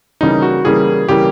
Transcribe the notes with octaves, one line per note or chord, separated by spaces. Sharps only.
C#3 E3 G3 A#3 D#4
F#4
C#3 E3 G3 A#3 G#4
C#3 E3 G3 A#3 G4